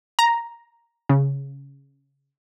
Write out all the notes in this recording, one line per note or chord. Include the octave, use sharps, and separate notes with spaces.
A#5
C#3